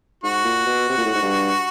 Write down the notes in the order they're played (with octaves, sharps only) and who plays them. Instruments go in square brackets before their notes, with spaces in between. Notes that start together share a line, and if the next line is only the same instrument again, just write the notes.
[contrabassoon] G#2 [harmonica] F#4
[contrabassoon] A#2
B2
C3
A#2
A2
G#2
G2